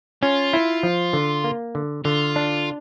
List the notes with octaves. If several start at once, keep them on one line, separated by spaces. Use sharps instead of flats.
C#4 F4
E4
F3
D3
A#3
D3
D3 F4
D4